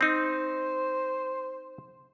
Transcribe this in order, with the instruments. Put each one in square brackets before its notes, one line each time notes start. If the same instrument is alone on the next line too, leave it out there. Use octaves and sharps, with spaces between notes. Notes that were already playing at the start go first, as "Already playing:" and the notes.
[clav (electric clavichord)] C4 D#4 [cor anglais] C5